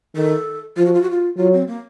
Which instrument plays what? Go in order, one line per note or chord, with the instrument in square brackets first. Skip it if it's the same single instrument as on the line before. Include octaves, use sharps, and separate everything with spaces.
[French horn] D#3 [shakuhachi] A4
[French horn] F3 [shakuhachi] F4
[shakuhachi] F#4
F4
F#4
F4
[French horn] F#3 [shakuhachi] F4
[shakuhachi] C4
A#3